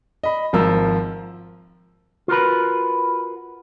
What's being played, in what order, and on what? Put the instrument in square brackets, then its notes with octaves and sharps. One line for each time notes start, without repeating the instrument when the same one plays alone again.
[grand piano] D#5 B5
G#1 F3 A#4 E6
[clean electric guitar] F4 F#4 A#4 B4